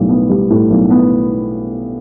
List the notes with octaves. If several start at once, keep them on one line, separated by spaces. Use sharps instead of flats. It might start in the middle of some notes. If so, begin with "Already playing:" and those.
Already playing: B1 A2 G3
B3
G3
A2
B1
B3